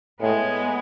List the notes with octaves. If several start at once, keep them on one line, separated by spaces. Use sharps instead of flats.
A2 G#3 B3